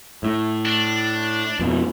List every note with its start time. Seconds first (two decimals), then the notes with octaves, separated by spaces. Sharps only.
0.23 A2
0.65 D4
1.60 F2 B2